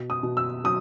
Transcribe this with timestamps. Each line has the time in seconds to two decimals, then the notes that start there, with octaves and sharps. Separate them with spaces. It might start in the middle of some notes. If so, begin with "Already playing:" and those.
Already playing: B2
0.10 D#6
0.23 B2
0.37 E6
0.64 F#3 D#6